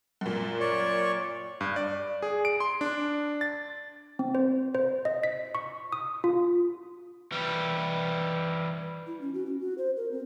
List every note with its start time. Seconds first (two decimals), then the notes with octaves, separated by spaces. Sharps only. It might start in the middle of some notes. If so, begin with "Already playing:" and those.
0.21 F#2 A#2
0.61 C#5 D5 C#6
1.61 G2
1.76 D5
2.22 G#4
2.45 D7
2.60 C6
2.81 D4
3.41 A6
4.19 C4
4.35 C5
4.75 C5
5.05 D#5
5.23 B6
5.55 C#6
5.92 D#6
6.24 F4
7.32 E3 G3
9.07 E4
9.21 C#4
9.34 F#4
9.46 C#4
9.61 F#4
9.78 C5
9.97 A#4
10.11 C4